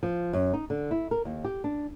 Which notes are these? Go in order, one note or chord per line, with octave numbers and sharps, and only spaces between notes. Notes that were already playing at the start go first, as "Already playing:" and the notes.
F3
F#2
D#4
D3
E4
A#4
D#2
G4
D4